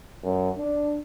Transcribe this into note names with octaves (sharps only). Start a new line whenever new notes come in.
F#2
D4